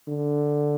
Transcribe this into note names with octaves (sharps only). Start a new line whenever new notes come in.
D3